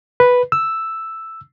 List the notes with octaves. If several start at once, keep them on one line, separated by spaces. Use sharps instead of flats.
B4
E6